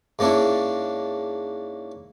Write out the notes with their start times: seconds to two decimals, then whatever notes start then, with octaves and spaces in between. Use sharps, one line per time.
0.19 G#2 A#3 C#4 D4 E4